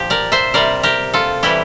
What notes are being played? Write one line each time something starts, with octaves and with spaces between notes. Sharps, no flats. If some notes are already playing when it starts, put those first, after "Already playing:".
Already playing: A#2 F3 G4
A#4 D5
C5 E5
C3 G3 A#4 D5
G4 A#4
F4 A4
C3 E3 G3 E4 G4